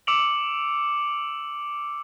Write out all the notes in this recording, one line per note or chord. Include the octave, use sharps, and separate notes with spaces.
D6 E6 C#7 D7 F7 F#7